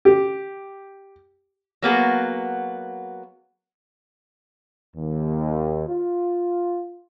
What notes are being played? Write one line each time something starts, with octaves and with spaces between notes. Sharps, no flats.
G4
F#3 A#3 B3 G#4
D#2
F4